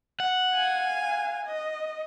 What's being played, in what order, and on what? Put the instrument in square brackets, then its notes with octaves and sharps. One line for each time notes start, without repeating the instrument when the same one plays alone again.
[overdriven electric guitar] F#5
[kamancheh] F5 G#5
D#5